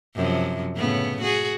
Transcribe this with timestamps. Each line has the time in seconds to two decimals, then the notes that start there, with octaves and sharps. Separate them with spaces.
0.16 F#2 C3 F3
0.77 A2 C#3 B3
1.21 F#4 G#4